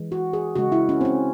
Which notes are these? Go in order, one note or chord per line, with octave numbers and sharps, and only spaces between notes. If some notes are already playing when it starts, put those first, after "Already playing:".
Already playing: E3 G#3
F#4
G#4
C#3 G#3 F#4
E4
C#4
C4
C#4